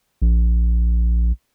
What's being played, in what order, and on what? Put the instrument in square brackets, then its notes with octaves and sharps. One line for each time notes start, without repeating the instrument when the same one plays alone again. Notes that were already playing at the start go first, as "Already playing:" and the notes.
[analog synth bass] A#1